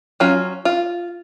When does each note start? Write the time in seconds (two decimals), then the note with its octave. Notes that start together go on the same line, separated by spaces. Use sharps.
0.20 F#3 C#4 F4
0.65 F4